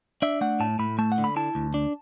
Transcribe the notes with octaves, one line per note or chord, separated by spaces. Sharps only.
D4 E5
A3 F#5
A2 A5
A2 B5
A3 A5
F#5
D3
B5
E4 A5
D2
D4